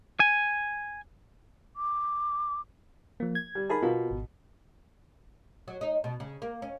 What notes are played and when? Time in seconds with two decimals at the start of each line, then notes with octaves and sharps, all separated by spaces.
0.20 G#5
1.76 D6
3.20 F3 A#3
3.35 G#6
3.55 G3
3.69 D#4 G#4 A#4 A5 B5
3.82 B2 B3 F4 A#4
4.11 G#1
5.68 F#3
5.81 D#4
6.04 B2
6.20 C#3
6.42 A#3
6.62 C#4